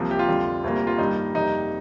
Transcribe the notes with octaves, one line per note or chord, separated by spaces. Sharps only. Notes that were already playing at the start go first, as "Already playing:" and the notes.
Already playing: C2 C3 F3 A#3
G4
F4
F2 D3 G3
D2 C3 G3 A#3
F4
G2 D#3 G3 A#3 D#4
F2 C3 G3 A#3 D#4